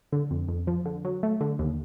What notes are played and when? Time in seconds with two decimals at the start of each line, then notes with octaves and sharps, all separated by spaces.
0.12 D3
0.31 F2
0.48 F2
0.67 F3
0.86 D3
1.05 F#3
1.23 A3
1.41 D3
1.59 D#2